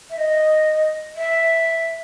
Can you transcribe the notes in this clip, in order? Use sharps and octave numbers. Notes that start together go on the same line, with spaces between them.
E5
D#5
E5